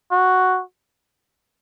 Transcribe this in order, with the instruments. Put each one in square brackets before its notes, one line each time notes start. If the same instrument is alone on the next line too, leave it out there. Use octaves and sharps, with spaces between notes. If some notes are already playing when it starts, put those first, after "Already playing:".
[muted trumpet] F#4